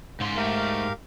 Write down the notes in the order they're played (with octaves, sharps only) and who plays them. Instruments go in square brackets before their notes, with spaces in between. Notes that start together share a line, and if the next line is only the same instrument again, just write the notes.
[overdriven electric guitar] G#2 [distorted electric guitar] C#3 C6
[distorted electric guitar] A3 [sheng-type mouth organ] G4 A#4 F5